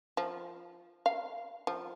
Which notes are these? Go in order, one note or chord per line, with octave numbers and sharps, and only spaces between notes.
F3
F5
F3